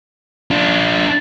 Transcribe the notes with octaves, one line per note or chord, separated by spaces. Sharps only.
D4 F4